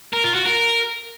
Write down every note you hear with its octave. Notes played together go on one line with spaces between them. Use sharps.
A#4
F4
F#4
A#4